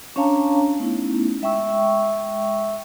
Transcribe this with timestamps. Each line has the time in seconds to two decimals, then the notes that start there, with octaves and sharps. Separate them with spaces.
0.16 C#4 D4 C#5 F5 A5 A#5
0.79 A3 B3 C#4 D#4 E4
1.42 G#3 E5 G5 C#6 E6